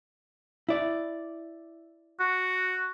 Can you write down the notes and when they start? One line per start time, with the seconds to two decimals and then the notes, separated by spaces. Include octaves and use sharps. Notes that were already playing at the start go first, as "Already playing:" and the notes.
0.69 E4 D5
2.20 F#4